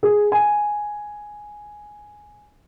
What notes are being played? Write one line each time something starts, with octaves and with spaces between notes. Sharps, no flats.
G#4
G#5